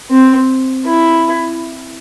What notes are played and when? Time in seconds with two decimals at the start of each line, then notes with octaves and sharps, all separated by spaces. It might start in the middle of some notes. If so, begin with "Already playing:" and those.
0.10 C4
0.85 E4